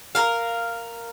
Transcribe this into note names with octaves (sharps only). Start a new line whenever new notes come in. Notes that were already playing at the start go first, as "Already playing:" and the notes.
A#4 F5